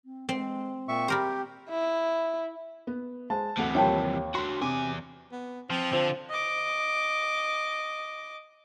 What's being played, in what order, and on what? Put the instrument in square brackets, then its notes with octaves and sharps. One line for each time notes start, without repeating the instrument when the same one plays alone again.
[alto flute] C4
[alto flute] G#3 [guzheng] C4
[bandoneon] A#2 E5 C#6 [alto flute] G5
[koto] G3 A#4 C5 [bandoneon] G4
[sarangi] E4
[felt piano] B3
[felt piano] G#3 C5 [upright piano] A5
[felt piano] D2 A4 F#5 [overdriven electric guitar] C3 E3
[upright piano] D#2 [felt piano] F3 G3 [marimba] C#5 G5 A5
[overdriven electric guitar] D4 F#4 [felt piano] C6
[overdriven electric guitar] E2 G#5 [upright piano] C3 [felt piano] D6
[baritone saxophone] B3
[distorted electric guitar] F3 [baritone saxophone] C4
[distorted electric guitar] D3 [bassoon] F3
[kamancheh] D#5 D6